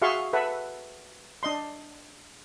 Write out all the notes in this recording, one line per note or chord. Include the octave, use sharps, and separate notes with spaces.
F#4 G#4 E5 F5 C6 C#6
A4 B4 E5 F#5
D4 D#5 C6